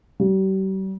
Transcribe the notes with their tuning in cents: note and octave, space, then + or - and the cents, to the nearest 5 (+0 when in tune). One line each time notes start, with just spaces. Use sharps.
G3 -40